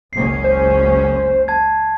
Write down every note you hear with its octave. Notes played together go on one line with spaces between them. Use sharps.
F#1 C#2 C#4 C7
C5
A5 G#6